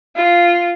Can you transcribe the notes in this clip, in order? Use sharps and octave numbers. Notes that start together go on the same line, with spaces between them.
F4